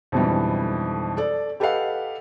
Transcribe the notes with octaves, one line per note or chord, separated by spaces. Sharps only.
F2 G#2 B2 D3 E3 G3
A4 D5
G4 A4 B4 D#5 F5 F#5